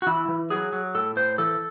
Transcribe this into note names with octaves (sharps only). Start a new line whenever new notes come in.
F#4
E3 E4
E3
F#3 G#4
F#3
A2 A4
A2 C5
E3 A4